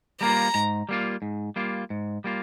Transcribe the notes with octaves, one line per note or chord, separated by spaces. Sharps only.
G3 A#3 F4 A#5
G#2
G3 A#3 F4
G#2
G3 A#3 F4
G#2
G3 A#3 F4